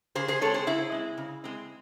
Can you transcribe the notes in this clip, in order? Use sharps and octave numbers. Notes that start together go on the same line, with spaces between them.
C#3 G#4 C5
G#4 C5
G#3 C4 A4 C#5
G#4 C5
C#3 E4 G#4
G#3 C4
C#3
G#3 C4